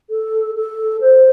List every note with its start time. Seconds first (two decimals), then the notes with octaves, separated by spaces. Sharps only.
0.10 A4
0.56 A4
1.01 C5